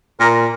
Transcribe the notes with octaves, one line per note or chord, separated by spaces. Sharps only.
A#2 A#4